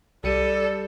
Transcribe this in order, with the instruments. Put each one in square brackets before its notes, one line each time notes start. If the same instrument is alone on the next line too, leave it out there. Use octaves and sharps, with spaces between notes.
[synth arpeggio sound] C2 C#7 D#7 [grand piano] G3 [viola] A4 [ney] D5